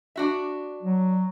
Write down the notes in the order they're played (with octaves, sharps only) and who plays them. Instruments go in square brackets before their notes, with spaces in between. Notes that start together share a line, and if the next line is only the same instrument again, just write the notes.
[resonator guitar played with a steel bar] D4 F#4 E5
[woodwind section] F#3